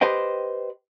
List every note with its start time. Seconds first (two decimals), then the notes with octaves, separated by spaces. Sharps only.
0.01 G4 B4 C5 D#5 G5